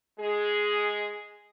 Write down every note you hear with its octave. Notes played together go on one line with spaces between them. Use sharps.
G#3 G#4